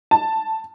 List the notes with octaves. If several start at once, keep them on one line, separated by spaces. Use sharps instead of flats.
A5